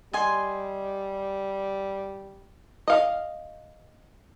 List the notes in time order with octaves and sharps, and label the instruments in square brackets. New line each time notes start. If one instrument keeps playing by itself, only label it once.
[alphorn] G3 [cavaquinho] D#5 G#5 C6
[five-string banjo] D#5 F5